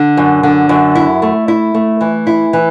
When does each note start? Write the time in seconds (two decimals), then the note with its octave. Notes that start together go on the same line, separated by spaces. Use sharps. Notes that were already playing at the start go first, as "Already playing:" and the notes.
Already playing: D3
0.17 F#2
0.43 D3
0.69 F#2
0.95 E4
1.22 A3
1.48 E4
1.74 A3
2.01 E3
2.27 E4
2.53 E3